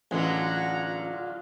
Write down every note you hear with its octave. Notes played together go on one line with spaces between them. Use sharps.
A1 D3 F#3 G#3 F4 F#5 A#5